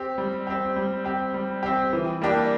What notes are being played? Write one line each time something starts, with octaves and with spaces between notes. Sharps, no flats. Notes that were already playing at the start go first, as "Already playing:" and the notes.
Already playing: C4 G4
G3
C4 G4
G3
C4 G4
G3
C4 G4
E3
G3 A#3 D4 G4